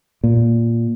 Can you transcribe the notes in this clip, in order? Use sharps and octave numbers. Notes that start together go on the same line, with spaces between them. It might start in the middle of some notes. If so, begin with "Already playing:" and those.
A#2